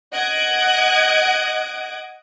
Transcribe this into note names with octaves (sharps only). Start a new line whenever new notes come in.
D#5 F#5 D#6 F#6 G#6 D7